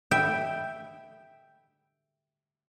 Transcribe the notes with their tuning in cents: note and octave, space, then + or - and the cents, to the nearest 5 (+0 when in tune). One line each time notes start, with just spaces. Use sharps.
E5 +0 G5 +0